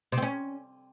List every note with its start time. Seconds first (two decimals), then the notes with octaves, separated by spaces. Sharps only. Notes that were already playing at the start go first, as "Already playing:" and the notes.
0.12 C3
0.17 C4
0.22 C#4